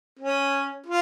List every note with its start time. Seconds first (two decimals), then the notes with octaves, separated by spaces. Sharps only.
0.19 C#4
0.86 F4